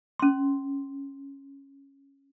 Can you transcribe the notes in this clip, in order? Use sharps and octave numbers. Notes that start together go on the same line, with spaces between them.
C#4 C6